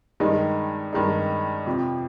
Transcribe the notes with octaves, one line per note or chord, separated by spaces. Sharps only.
G2 D#3 G#3 D#4
G2 D#3 G#3 D#4
F2 C3 F3